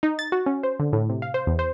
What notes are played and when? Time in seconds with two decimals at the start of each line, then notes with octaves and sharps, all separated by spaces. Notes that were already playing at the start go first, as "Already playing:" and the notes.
0.03 D#4
0.19 A6
0.32 F#4
0.46 C#4
0.63 C5
0.80 D3
0.93 A2
1.10 C3
1.22 F5
1.34 C5
1.47 E2
1.59 C5